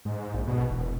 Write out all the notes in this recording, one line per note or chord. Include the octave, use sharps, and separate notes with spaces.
G#2
A#1
B2
E1